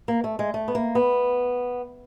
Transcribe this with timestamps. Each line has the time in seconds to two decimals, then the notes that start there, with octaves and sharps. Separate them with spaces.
0.08 A#3
0.24 A3
0.39 G#3
0.54 A3
0.68 B3
0.75 A#3
0.95 B3